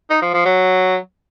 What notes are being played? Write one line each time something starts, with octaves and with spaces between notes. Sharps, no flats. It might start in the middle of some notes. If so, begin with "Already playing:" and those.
D#4
F3
F3
F#3